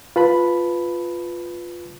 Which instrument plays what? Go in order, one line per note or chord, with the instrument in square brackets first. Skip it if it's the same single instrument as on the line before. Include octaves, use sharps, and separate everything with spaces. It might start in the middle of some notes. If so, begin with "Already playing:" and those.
[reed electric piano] F4 B4 A5 B5